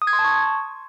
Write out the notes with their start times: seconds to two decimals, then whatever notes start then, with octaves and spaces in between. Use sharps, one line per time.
0.02 D#6
0.07 G#6
0.13 C6
0.19 A5
0.25 C#6